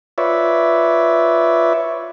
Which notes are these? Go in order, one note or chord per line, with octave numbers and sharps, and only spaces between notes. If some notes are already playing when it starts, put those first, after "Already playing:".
F4 B4 C#5 D5 E5